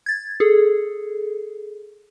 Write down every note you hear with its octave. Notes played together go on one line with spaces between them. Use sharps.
G#6 A6
G#4 A4